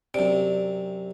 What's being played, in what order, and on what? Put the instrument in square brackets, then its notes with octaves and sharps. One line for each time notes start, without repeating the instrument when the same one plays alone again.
[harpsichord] F#2 C3 [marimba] D5